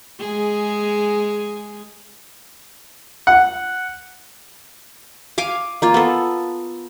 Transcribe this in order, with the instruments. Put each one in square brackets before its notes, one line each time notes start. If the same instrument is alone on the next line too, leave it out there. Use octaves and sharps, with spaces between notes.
[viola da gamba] G#3 G#4
[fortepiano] F#5
[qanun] F5 G#5 D6
A#3 F4
B3 A4